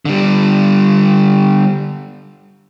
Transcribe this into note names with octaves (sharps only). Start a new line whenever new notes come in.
D3 G3